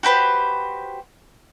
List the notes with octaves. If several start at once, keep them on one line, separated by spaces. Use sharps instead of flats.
F#4 G4 B4 C5